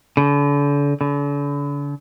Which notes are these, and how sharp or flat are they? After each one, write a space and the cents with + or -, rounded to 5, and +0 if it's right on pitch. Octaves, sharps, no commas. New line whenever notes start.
D3 -40
D3 -40